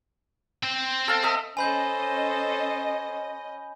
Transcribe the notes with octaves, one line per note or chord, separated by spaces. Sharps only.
C4 C5
A4 F5 A5
A4 D#5 E5
C#4 A4 C5 D#5 G#5 B5 G6